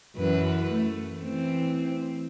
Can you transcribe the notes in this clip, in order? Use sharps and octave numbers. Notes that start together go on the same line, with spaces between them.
F#2 E3 B4
A3
E3 C4